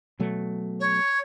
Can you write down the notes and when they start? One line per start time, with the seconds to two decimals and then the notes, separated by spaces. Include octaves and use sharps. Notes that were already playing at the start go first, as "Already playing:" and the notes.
0.20 B2 F#3 A3
0.79 C#5